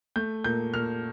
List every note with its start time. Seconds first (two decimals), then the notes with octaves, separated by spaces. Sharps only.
0.16 A3 G6
0.44 A#2 G6
0.74 A#2 F6